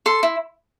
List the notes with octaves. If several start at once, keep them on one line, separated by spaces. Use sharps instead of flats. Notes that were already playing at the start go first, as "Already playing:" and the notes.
A4 C6
E4